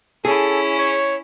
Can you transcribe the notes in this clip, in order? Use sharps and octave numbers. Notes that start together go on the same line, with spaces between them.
C#4 E4 G#4 A4
C#5